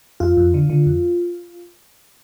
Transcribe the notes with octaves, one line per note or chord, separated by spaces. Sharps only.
F2 F4
F2
D3
D3
F2